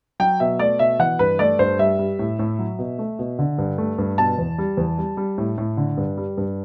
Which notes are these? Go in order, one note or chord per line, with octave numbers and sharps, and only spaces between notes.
F#3 G5
B2 E5
A3 D5
B2 E5
E3 F#5
G2 B4
A3 D5
G2 C5
G3 E5
G3
A2
A2
F#3
B2
A3
B2
D3
G2
A3
G2
B2 A5
E2
G3
E2
G3
G3
A2
A2
D3
G2
G3
G2